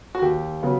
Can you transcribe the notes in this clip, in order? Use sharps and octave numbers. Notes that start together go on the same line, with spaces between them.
F#4
D#2 G4
C#3 F#3 B3